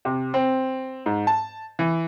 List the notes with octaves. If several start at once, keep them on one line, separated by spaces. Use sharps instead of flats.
C3
C4
G#2
A5
E3